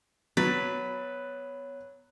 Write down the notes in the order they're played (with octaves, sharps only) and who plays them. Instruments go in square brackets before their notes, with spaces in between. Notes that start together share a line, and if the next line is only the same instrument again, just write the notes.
[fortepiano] F#3 [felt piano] B3 A6 [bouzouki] B4 [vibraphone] C#5